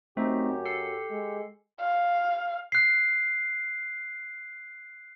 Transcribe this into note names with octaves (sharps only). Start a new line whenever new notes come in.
F#2 A3 C4 D#4 G4 C5
A4 C7
G#3
F5
F#6 C7